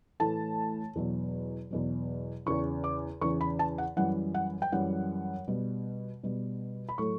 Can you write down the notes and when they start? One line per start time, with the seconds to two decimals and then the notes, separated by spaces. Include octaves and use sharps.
0.20 A2 E3 A3 A5
0.96 E2 B2 F#3
1.71 E2 B2 F#3
2.46 E2 C#3 E3 C#6
2.84 D6
3.21 E2 C#3 E3 C#6
3.41 B5
3.59 A5
3.78 F#5
3.96 F#2 E3 G3 F#5
4.34 F#5
4.62 G5
4.72 F#2 E3 G3 F#5
5.48 B2 G3
6.24 B2 G3
6.89 B5
6.98 A2 F#3 A3 C#6